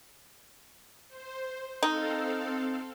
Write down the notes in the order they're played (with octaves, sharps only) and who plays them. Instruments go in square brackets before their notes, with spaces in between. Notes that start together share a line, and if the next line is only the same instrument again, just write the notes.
[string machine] C5
[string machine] C4 A4 F5 [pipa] D#4